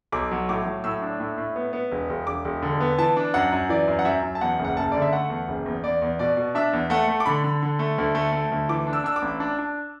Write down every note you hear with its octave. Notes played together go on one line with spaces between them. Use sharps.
B1 D6
F#3
A2 D6
F#3
A2 E6
D4
A2
A2
B3
B3
E1
E1
E1 D6
E1
D3
B3
E3 A5
D4
F#2 F#5
F#2
E3 D5
F#2
F#5
F#2 E5
F#2
A5
E2 F#5
F#1
F#5
F#1 A5
D3 D5
E5
A3 F#5
E2
F#1
E2
E2 D5
E2
B2 D5
B2
D4 E5
E2
A3 F#5
A3
D6
D3 B5
D3
D3
A3
D2
A3
A3
D2
E3 D6
D4
E6
D4 E6
D6
A1
D4
D4